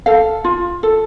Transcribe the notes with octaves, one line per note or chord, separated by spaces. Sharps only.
A4 F5
F4
A4